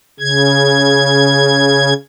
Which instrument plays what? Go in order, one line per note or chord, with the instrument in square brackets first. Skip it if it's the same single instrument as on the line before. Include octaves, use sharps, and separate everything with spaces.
[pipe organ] C#3 G#6